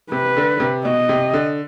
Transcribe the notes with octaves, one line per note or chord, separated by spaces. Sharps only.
C3 B4
D3
C3
B2 D#5
C3
D3